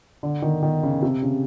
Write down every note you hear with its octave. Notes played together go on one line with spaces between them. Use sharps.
D3
D#3
D#3
C#3
C3
C#3